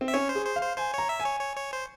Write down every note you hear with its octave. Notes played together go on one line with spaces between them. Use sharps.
C4
E5
C#4 C#5
C5
G#4
C5
F5
C5
C5 G#5
C#5 A#5
E5
G#5
C#5
C#5
C#5
C5